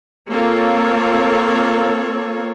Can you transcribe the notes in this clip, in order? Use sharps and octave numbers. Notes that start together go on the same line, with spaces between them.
A#3 C4 F4 A4 C#5